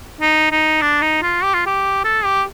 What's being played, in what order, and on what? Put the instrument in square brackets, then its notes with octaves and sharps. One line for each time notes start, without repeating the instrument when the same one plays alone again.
[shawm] D#4
D#4
D4
D#4
F4
G4
F4
G4
A4
G4